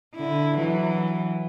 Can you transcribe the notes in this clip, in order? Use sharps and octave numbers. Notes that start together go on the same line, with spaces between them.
D3 E4
E3 F#3